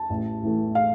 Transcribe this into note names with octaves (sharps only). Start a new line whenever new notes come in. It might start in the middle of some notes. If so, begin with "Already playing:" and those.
Already playing: A5
A1
A2 E3 A3
F5